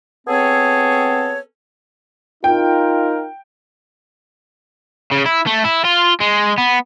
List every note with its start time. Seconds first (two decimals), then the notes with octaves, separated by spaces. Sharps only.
0.27 B3 C4 G#4 A4 C#5
2.44 D#4 F4 A#4 G5
5.11 C#3
5.26 E4
5.47 A3
5.65 E4
5.85 F4
6.21 G#3
6.58 B3